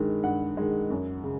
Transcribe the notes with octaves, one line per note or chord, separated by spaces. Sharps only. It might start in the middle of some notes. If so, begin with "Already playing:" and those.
Already playing: G2 D#3 G#3
G2 F#5
D#3 G#3
F#2
C#3